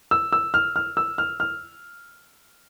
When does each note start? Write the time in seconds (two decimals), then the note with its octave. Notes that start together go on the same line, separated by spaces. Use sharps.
0.11 E6
0.32 E6
0.54 F6
0.76 F6
0.97 E6
1.18 F6
1.40 F6